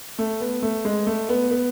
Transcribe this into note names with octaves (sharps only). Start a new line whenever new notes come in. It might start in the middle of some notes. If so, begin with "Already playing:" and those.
A3
B3
A3
G#3
A3
B3
B3